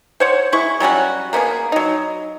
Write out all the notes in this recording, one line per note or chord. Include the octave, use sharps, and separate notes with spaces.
C5 C#5 F#5
G#3 E4 C#6
F#3 G3 C#4 F#4
A#3 B3 D4 G#4
F#3 D#4